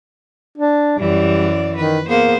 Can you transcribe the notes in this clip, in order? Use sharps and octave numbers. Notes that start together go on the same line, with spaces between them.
D4
F#2 E3 G3 D5
D#3 B4
A#3 B3 G#4 C5